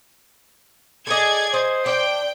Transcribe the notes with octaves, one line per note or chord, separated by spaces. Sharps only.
G#4 A4 D5 D#5 G#6
C5 D#5
D4 G5